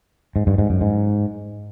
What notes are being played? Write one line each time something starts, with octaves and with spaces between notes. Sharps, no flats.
G#2
G2
G#2
F#2
G#2